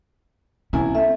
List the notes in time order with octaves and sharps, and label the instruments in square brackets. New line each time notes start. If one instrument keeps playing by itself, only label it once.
[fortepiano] C2 E4 G#5 [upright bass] C4 C#4
[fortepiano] A3 [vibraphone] E5